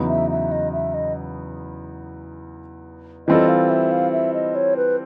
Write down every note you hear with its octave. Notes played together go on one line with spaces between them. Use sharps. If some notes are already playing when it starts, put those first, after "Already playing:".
Already playing: E2 C#3 F#3 B3 D#4
E5
E5
D#5
E5
D#5
E3 G3 C4 F4 A4 D#5
F5
E5
F5
E5
D#5
C#5
B4